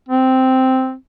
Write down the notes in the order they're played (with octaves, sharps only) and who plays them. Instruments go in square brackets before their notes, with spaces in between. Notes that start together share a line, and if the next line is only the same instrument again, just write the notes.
[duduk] C4